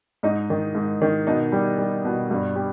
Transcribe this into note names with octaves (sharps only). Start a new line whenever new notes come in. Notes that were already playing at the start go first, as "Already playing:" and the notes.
G#2 D#4
D#3
G#2
D#3
B2 D#4
G3
G3
B2
G2
G3